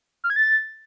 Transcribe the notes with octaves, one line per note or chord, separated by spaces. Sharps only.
F6
G#6
A6